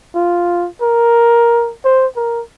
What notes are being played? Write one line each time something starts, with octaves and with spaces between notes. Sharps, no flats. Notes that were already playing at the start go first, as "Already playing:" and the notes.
F4
A#4
C5
A#4